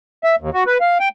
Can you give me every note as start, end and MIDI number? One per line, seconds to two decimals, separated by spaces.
0.24 0.36 76
0.40 0.50 39
0.54 0.64 66
0.66 0.78 71
0.81 0.98 77
1.00 1.09 79